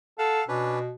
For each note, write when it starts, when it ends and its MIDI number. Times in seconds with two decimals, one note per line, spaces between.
0.18 0.42 69
0.18 0.44 77
0.18 0.44 78
0.48 0.93 47
0.48 0.79 61
0.48 0.79 62
0.48 0.79 71